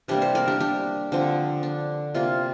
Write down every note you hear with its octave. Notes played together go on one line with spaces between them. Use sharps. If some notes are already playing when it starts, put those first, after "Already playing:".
C3 G3 A#3 D4 G4
G4 C5
A#4 D5
D4 G4
D4 G4
D3 F3 C4
D4
C3 A#3 F4